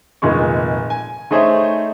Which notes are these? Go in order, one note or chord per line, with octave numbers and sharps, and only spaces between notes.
F1 A#2 D#3 G#3 G#4 C#6
G#5
A3 D#4 G#4 C5 C#5 E5